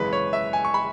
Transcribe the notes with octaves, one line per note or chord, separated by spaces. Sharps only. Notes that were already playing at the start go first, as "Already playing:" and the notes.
Already playing: G#1 F#2 C#3 E3 G#3 B4
C#5
E5
G#5
C#6
B5